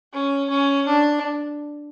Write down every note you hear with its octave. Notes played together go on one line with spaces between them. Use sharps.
C#4
C#4
D4